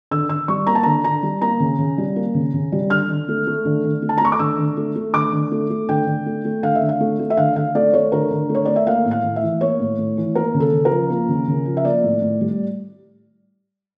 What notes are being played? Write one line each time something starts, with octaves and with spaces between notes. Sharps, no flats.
D3 E6
D3 E6
G3 C#6
A#3 A#5
A5
D3 A#5
D3 A#5
G3
A#3 A#5
C#3
C#3
G3
A#3
C#3
C#3
G3
D3 F6
D3
A3
A3
D3
D3
A3
A5
A#5
A3 C#6
D6
D3 E6
D3
A3
A3
D3 D6
D3
A3
A3
D3 G5
D3
A3
A3
D3 F5
E5
D3
F5
A3
A3
E5
D3 F5
D3 F5
A3 D5
A3 C#5
D3 A#4
D3
A3
C#5
A3 D5
E5
A#3 F5
A2
F5
A2
E5
E3
A#3 C#5
A2
A2
E3
A#3 A#4
C#3
A4
C#3
A#4
F3
A#3
C#3
C#3
F3
E5
A#3 D5
A2
A2
G3